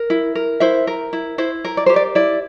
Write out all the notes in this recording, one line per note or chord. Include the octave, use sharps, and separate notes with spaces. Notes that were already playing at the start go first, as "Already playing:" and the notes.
Already playing: A#4
E4
A#4
E4 C5 E5
A#4
E4
E4 C5
A#4
D5
G4 C5
D5
E4 D5